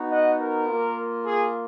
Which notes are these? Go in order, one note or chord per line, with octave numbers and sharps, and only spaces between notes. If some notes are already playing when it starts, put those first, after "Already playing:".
Already playing: B3 D#4 F#4
D#5 F#5
A#4
A#3 F4
G#4